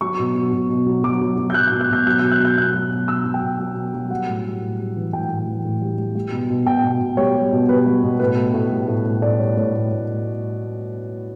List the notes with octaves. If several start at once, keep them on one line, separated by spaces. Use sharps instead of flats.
F#3 C#6
B2
F#3
B2
B2
F#3
F#3 D6
F#3
F#3
G6
F#3 F#6
G6
B2
F#6
B2 G6
F#3 F#6
B2 G6
F#6
F#3
G6
B2 F#6
F#3
B2
F#3 E6
F#3
G5
B2
F#3
B2
F#3
G3 F#5
A2
G3
A2
G3
E3
A2 G5
A2
E3
A2
G3
G3
G3
B2
B2
B2 G5
B2
B2
G3 C#5
G3
B2
G3 B4
G3
B2
A2 B4
A2
A2
G3
A2
A2
A2 D5
G3 C#5
A2 C#5
A2
A2